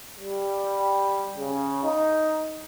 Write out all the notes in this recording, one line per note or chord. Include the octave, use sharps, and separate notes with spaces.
G3
C#3
D#4